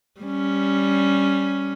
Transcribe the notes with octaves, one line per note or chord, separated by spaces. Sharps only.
G3 C#4